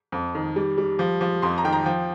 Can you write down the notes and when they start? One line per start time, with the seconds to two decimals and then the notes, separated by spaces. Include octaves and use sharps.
0.12 F2
0.35 D#3
0.56 G3
0.78 G3
0.99 F3
1.21 F3
1.42 F2 C6
1.58 A#5
1.64 D#3 G5
1.72 A#5
1.86 F3 G5